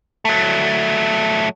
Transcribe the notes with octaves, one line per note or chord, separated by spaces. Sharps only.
F#3 A3